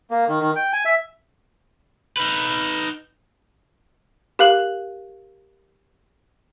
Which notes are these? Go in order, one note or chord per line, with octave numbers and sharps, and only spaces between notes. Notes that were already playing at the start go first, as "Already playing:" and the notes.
A#3
D#3
D#3
G5
G#5
E5
D#4 B4
G4 A#4 F5 F#6 F#7